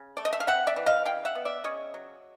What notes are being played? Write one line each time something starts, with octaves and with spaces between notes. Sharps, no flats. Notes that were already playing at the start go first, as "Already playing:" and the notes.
Already playing: C#3
A3 D5
D#5
E5
F5
C4 E5 F#5
D5 E5
E3
D#5 F5
C#3 F5 G5
E5 F#5
B3
D5 E5
C#3 C#5 D#5
F#3